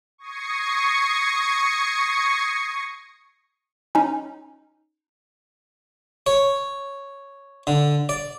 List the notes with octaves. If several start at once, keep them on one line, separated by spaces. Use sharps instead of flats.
C#6 D#6 G#6 A#6 C7 C#7
C#4 D#4
C#5
D3
D5